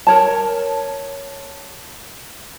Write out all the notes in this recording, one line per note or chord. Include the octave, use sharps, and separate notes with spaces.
A#4 C#5 A5